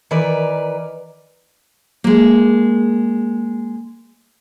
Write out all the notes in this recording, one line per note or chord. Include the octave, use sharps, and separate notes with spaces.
D#3 E3 A#4 B4 D5
G#3 A#3